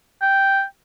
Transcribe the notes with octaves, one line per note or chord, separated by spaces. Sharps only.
G5